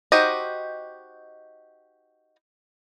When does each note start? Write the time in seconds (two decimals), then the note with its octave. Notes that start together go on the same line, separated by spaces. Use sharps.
0.12 D#4 F#4 G4 C5 D#5